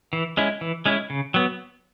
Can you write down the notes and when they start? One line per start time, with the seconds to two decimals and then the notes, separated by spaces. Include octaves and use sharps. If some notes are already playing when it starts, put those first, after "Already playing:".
0.13 E3
0.37 G#3 C#4 E4
0.61 E3
0.86 G#3 C#4 E4
1.10 C#3
1.34 F#3 B3